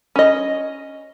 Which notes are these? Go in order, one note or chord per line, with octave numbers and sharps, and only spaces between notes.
C#4 D#5